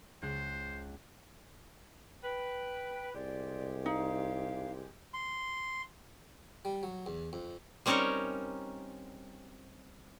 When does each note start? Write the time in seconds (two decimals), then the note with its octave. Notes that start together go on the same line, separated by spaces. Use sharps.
0.22 C#2 C5 F#6
2.23 B4 G5
3.15 C2 G#3 G4 D5
3.86 D#4 F5
5.14 C6
6.65 G3
6.83 F#3
7.06 E2
7.33 F2
7.86 G3 C4 C#4 D#4 A#4 C#5